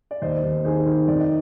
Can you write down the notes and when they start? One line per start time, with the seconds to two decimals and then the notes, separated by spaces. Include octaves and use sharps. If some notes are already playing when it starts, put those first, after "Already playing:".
0.11 D5
0.22 D#2 C5 D#5
0.43 D#2
0.65 D#3 G#4 C5
0.86 D#3
1.08 F2 D5
1.20 D#5